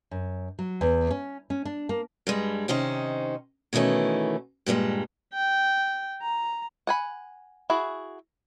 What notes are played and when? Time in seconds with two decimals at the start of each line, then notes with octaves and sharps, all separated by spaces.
0.11 F#2
0.59 F#3
0.81 E2
1.11 C#4
1.50 C#4
1.65 D4
1.89 A#3
2.27 G2 G3 G#3
2.68 C3 D#3 C#4 D#4 C5
3.73 B2 D#3 E3 A3 C#4
4.66 G2 A#2 E3 G3 G#3
5.34 G5
6.22 A#5
6.87 F#5 G#5 B5
7.70 E4 F#4 G#4